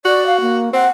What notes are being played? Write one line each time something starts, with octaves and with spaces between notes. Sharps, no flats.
F#4 D5
F5
A#3
C4 F#5